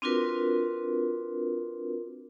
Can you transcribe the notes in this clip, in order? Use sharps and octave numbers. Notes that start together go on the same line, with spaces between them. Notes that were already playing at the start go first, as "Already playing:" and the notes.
C4 D4 F4 F#4 A#4 B4